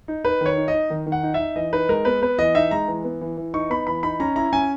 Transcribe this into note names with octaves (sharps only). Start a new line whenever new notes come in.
D#4
D#4 B4
D#3 C#5
D#4
D#5
D#4
D#3
D#3
F#5
D#4
D#4 E5
E3 D#5
D#4 B4
G#3 A#4
B3 B4
B3 B4
E3 D#5
D#4 E5
G#3 A#5
E3
B3
E3
E3
D#4 C#6
B3 B5
E3 B5
D#4 B5
C#4 A#5
E4 A#5
C#4 G#5